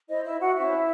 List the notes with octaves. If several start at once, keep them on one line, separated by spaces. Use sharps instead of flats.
E4 C5 D#5
E4 E5
F#4 F#5
C#4 E4 F#4 C5 E5